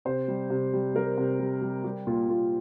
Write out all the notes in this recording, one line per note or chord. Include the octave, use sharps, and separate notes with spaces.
C3 C5
G3
C3
G3
G3 A#4
C3
G3
G3
G3 G4
A#2 F4
A#2 F4